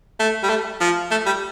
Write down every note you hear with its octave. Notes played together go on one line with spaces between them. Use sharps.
A3
G3
A3
F3
A3
G3